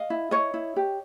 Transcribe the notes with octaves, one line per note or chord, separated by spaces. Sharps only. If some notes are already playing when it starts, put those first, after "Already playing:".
Already playing: D#5 F5
E4
E4 C#5 D#5
E4
G4